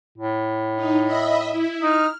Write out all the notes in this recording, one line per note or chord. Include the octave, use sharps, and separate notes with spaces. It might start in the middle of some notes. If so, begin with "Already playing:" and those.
A2
D#4
D#5 E5 B5
E4
D#4 F6